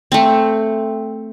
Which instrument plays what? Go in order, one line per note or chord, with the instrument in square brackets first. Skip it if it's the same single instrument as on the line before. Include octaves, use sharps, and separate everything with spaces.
[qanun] A3 C4